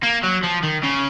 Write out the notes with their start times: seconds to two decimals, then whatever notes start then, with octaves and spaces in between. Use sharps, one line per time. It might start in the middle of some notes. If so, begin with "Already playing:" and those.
0.03 A#3
0.23 F#3
0.43 F3
0.63 D#3
0.83 C#3